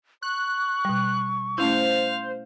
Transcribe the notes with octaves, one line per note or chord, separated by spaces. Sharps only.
C#6 F#6
B2 G3
A3 C#4 E4 C5 F5